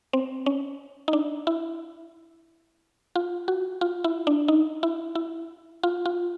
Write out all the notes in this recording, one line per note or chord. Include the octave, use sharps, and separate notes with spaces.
C4
C#4
D#4
D4
E4
F4
F#4
F4
E4
D4
D#4
E4
E4
F4
F4